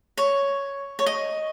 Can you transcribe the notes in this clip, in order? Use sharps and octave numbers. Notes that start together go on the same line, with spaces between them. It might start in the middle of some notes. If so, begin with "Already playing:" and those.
C#5
C#5
D#5